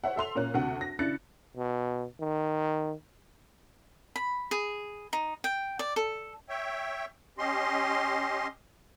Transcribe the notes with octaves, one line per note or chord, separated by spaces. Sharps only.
C5 C#5 E5 F#5
A4 E5 C6 F7
A#2 A#3 C#4 F#6
D2 C3 F#4 F#5
A#6
C#3 D4 E4 F#6 A6 C#7
B2
D#3
B5
G#4
D#4
G5
D5
A4
C#5 E5 G5
C#4 G4 D#5 C6